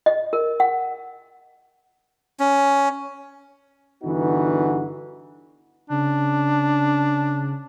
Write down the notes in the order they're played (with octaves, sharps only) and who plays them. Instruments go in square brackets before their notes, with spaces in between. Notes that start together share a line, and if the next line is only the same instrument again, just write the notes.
[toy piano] D#5
A#4
F#5
[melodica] C#4
[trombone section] G2 D3 E3 B3 D#4 F#4
[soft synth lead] C#3 [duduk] D4